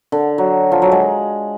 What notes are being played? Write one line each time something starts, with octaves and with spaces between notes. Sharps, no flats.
D3
F#3
F3
F#3
G#3